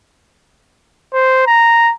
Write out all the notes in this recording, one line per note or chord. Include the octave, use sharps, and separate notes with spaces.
C5
A#5